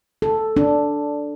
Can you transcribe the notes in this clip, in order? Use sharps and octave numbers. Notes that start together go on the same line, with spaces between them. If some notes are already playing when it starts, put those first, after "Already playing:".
A4
D4